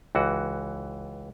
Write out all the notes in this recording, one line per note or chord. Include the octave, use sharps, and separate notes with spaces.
C#2 E3 F#4